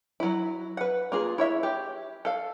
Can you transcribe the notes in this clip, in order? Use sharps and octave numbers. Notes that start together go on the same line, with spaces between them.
F#3 E4
B4 F#5
A#3 F4 G#4
E4 C#5 E5
G4
A4 F5